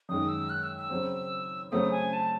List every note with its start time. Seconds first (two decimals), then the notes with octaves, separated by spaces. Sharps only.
0.09 F#2 D#3 G#3 D#6
0.29 E6
0.50 F#6
0.63 E6
0.77 E6
0.90 C#3 F#3 C4
1.71 C#3 F#3 A3 C4 D#6
1.92 G#5
2.13 A5